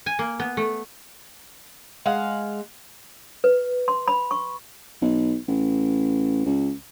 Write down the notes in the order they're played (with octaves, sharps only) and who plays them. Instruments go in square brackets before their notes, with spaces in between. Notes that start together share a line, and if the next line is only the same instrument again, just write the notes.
[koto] G#5
A#3
B3
A3
[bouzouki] G#3 F5 F#5
[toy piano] B4
C6
B5
C#6
[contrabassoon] B1
A1
C#2